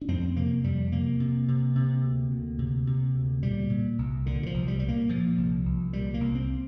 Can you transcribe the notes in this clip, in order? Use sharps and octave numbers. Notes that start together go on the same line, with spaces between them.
D4
F2 C4
C3 A#3
F2 G3
C3 A#3
C3
C3
C3
D2
D2
C3
C3
D2
A#2 G3
A#2
C2
A#2 D3
D3
F3
C2
G3
A#2 G3
A#3
A#2 F3
C2
C2
A#2 G3
A#3
C2
C4